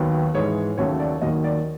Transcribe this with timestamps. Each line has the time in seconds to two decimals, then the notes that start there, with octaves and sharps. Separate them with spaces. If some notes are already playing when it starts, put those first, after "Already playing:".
Already playing: D#2 D#3 F#3 B3
0.34 G#2 E3 G#3 C#5
0.78 D#2 C#3 F#3 A3 C#5
0.99 D5
1.22 D#2 D#3 F#3 A#3 D#5
1.44 D5